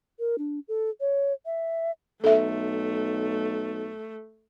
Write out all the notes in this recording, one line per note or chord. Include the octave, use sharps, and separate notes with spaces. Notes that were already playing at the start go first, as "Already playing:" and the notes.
A#4
D4
A4
C#5
E5
B1 A3 A4 E5